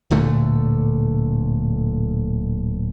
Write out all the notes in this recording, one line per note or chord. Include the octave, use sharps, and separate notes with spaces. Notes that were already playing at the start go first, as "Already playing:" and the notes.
D1 A#2 D3 A3